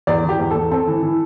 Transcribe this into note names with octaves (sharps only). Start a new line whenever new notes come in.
E2 D5
E3 G4
E2
E2 A4
C4 A4
E3
E3